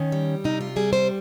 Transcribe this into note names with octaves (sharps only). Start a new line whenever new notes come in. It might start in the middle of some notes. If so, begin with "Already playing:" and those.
Already playing: D#3 C#4
G3
C3 D#4
F4
G3 G#4
C5